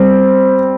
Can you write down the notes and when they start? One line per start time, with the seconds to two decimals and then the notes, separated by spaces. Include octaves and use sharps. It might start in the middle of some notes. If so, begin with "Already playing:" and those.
Already playing: G3 C4